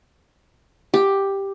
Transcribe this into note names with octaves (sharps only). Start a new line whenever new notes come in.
G4